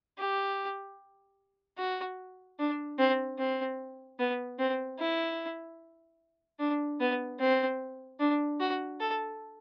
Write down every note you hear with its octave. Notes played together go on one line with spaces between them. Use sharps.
G4
F#4
D4
C4
C4
B3
C4
E4
D4
B3
C4
D4
F#4
A4